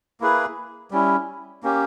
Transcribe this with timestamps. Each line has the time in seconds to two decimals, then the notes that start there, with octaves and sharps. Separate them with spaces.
0.21 A#3 E4 G#4 B4
0.91 G3 C#4 E4
1.63 A#3 C#4 G4